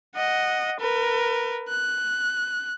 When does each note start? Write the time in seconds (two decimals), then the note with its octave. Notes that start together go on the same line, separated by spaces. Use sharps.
0.16 D#5 F#5
0.80 A#4 B4
1.69 F#6